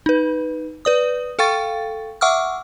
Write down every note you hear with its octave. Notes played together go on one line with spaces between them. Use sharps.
D#4 B4
B4 D5 D#6
A4 F5 G5 C#6 A6
E5 F#5 C#6 D6 E6 F6